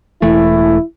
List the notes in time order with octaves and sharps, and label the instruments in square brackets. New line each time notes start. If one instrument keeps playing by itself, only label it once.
[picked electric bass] E1 E3 A3 [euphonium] E4